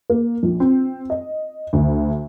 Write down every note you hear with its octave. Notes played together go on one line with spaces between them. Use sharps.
A#3
A#1
C4
D#5
D2